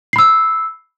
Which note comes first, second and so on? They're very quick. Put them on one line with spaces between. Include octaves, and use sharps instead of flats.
C7 B5 E6